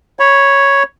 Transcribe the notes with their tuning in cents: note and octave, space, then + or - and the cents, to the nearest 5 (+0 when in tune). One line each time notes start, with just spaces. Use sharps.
C#5 +0 B5 -10